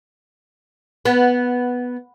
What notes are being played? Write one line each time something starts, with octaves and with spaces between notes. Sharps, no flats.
B3